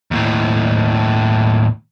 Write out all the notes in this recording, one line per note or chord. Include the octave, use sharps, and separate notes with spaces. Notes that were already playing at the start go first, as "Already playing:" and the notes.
D#2 A2